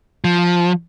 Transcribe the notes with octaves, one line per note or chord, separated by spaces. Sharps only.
F3